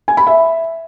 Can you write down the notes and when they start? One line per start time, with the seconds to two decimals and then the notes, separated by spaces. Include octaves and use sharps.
0.08 G#5
0.17 B5
0.27 E5